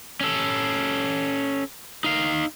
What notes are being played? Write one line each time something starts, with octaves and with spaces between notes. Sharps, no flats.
C#4 A4
D#4 F5